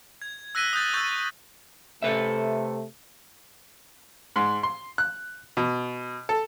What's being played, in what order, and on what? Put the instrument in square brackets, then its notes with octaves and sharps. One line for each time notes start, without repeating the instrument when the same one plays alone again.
[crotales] G#6
E6 F#6 A#6 B6 D#7 G7
D#6 F#6 G6 A6
C#6 E6 G6 A6 D#7
[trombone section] C3 A3 [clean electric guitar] A4 B4 E5
[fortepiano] G#2
C6
F#6
B2
A4